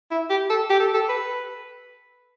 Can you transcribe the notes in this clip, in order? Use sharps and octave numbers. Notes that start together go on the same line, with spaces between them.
E4
G4
A4
G4
A4
A4
B4